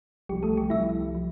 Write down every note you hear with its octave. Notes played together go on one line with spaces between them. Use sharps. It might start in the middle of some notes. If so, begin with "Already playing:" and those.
C2 C3 F3 G3 G4
A3 A4
G3 G4
C2 C3 F3 E4 E5
F3